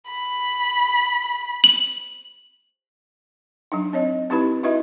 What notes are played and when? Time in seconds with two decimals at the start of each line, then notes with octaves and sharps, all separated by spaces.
0.10 B5
1.64 F#7
3.72 F#3 D4 D#4
3.93 C4 C#5 D#5
4.30 C4 D#4 E4 G4 B4 B5
4.63 D#4 E4 F#4 B4 D#5 E5